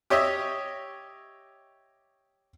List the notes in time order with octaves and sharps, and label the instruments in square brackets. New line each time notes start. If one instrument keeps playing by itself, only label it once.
[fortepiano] G4 C#5 D#5 E5